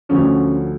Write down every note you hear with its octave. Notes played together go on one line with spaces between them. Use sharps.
D2 D3 F3 C#4